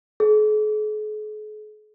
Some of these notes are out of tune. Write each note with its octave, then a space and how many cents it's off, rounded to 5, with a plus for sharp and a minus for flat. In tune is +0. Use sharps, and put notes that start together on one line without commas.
G#4 +45